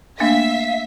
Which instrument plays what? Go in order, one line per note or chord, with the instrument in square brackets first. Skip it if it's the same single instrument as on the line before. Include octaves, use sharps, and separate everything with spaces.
[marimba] A3 A#3 D4 [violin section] E5 B6 [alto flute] F5